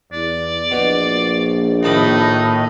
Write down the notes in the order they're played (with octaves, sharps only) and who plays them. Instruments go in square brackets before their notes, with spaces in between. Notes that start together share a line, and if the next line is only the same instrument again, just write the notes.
[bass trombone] E2 [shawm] D5
[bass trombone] A#1 [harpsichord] B2
[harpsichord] D#2 A5 B5 [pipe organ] A2 D#5 [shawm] D#4